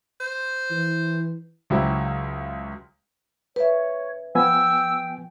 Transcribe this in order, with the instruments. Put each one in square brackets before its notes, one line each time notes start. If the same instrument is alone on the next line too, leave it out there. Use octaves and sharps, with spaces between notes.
[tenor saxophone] C5
[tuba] E3
[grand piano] C#2 F#3 E4 G4 C5
[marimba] B4 E5 [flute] C#5
[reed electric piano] F3 B3 G#5 [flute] G5 [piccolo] E6